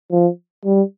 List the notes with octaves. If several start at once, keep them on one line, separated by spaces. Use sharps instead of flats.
F3
G3